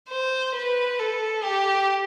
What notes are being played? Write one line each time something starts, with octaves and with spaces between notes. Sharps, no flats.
C5
B4
A4
G4